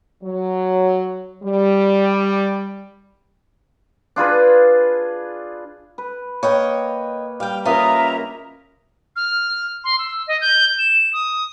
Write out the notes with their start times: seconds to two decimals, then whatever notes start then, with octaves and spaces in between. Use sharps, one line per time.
0.22 F#3
1.43 G3
4.16 D4 F4 G#4 B4
5.98 B4
6.43 A#3 B4 C#5 D#5 G5
7.40 G3 F5 G5
7.65 C#3 A#3 F4 A#4 B4 D#5 E5 A#5
9.16 F6
9.84 C6
9.98 E6
10.27 D#5
10.41 G6
10.79 E7
11.13 D#6